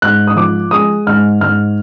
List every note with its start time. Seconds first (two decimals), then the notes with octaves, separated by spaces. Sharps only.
0.02 G#2 F#6
0.27 D#6
0.36 F3 D6
0.71 G#3 D#6
1.07 G#2 F6
1.41 G#2 F6